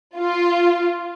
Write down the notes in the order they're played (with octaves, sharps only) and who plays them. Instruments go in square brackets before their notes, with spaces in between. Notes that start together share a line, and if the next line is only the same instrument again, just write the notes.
[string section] F4